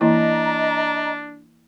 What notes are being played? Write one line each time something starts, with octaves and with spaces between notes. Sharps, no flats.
E3 A#3 D4 E4 D#5 A#5